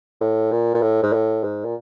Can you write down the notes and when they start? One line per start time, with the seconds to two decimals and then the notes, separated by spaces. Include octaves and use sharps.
0.21 A2
0.51 A#2
0.74 A#2
0.82 A2
1.03 G#2
1.13 A2
1.44 G#2
1.65 A#2